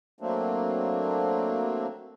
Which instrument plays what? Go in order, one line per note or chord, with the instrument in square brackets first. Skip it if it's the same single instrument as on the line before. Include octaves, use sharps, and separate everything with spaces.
[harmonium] F#3 A3 A#3 C4 D4